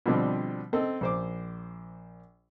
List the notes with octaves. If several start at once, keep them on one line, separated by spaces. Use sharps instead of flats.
B2 D3 F3 G3 C4
C4 A4 D#5
A#1 C5 D6